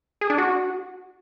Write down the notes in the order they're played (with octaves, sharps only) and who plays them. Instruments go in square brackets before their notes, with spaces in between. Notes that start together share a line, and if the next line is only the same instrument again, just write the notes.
[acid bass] G#4
D4
F#4